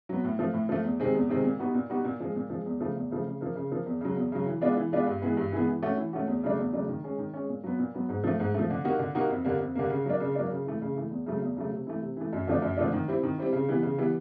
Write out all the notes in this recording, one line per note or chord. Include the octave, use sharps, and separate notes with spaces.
F#3 B3
A2
F3 A3
A2
F3 A3
E2
C3 D#3 G#3 C4
E2
C3 D#3 G#3 C4
A#2
G3 B3 D#4 F#4
A#2
G3 B3 D#4 F#4
A#2
F3 G#3
A#2
F3 G#3
E2
C#3 F3 A3
E2
C#3 F3 A3
C#3
F3 A#3
C#3
F3 A#3
E2
C#3 F#3
E2
C#3 F#3
E3
G#3 B3 D4 F4
E3
G#3 B3 D4 F4
G2
E3 G#3 B3
G2
E3 G#3 B3
E3
A3 C#4 F#4
E3
A3 C#4 F#4
E2
C#3 F#3 A3 D4
E2
C#3 F#3 A3 D4
D#3
G#3 C#4
D#3
G#3 C#4
A#2
F#3 B3
A#2
F#3 B3
G#2
F3 A3
G#2
F3 A3
D3
G3 A#3 D#4 F#4
D3
G3 A#3 D#4 F#4
F2
D3 G3 A#3
F2
D3 G3 A#3
C#3
F#3 A#3 D4
C#3
F#3 A#3 D4
C#3
E3 A3
C#3
E3 A3
E2
C#3 F#3 A3
E2
C#3 F#3 A3
C3
E3 A3
C3
E3 A3
F#2
D3 F3 A3 D4
F#2
D3 F3 A3 D4
D#3
G3 C4 E4
D#3
G3 C4 E4
C#3
E3 G3 B3
C#3
E3 G3 B3